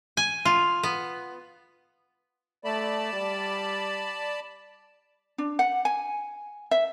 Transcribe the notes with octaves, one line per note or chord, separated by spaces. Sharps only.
G#5
F4
B3
A3 D5 A5 B5
G3
D4
F#5
G#5
E5